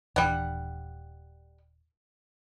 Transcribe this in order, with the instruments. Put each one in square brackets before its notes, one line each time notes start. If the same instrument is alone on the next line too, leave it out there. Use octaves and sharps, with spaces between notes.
[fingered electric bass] D#1 E3 D4 [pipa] G3 F#5